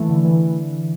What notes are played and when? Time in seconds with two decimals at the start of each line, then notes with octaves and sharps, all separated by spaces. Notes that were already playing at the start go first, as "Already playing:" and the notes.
Already playing: E3 A3
0.09 D3
0.24 E3